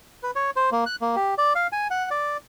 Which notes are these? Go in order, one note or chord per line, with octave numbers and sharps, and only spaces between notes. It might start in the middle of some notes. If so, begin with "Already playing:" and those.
B4
C#5
C5
A#3
F#6
A#3
G4
D5
F5
G#5
F#5
D5